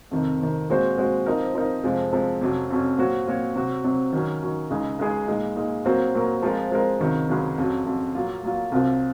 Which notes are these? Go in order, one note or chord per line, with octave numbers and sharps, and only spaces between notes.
F2 C3 D#3
F2 C3 D#3
A#2 G#3 C4 F#4 C5
A#2 G#3 C4 F#4 C5
F3 C4 D#4 A#4
F3 C4 D#4 A#4
F2 C3 F3 G#3
F2 C3 F3 G#3
F2 C3 F#3 C#4
F2 C3 F#3 C#4
A#2 F#3 C4 F#4 C#5
A#2 F#3 C4 F#4 C#5
C3 F#3 C4 F#4
C3 F#3 C4 F#4
D#3 F#3 C#4
D#3 F#3 C#4
C#2 C#3 G#3 D#4 G#4
C#2 C#3 G#3 D#4 G#4
A#2 G#3 D#4
A#2 G#3 D#4
A#2 F#3 C4 F#4 A#4
A#2 F#3 C4 F#4 A#4
F3 G#3 C4 F4 A#4
F3 G#3 C4 F4 A#4
C#2 C3 D#3 F#3
C#2 C3 D#3 F#3
F2 C#3 F#3
F2 C#3 F#3
A#2 F#3 A#3 F4
A#2 F#3 A#3 F4
C2 C3 F#3 C4 F4